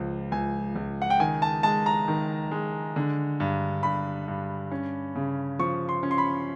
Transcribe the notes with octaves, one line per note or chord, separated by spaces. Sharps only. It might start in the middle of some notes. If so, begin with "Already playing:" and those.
Already playing: C#2 F3
C#2 G#5
C#2
F#5
G5
D#3 G#5
A5
G#3 A5
A#5
D#3
G#3
D3
G2
G2 B5
G2
C#4
C#3
F3 C#6
C6
C#4
C6
B5